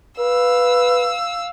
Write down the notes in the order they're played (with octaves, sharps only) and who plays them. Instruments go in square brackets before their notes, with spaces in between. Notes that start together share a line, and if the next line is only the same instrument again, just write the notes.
[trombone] B4 [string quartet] F5 E6